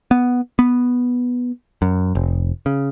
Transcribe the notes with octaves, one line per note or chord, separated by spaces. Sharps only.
B3
B3
F#2
F1
C#3